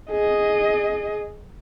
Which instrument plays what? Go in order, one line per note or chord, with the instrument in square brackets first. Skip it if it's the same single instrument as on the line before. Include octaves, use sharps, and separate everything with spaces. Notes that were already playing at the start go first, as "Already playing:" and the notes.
[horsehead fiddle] G#4 D#5